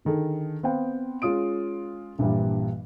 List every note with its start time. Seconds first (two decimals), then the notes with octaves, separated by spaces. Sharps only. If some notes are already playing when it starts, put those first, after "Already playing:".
0.05 D3 D#3 G#4 A4
0.63 B3 C4 C5 F5 G5
1.22 G#3 C#4 F4 D#6 D7
2.18 A#1 G2 A#2 E3 G3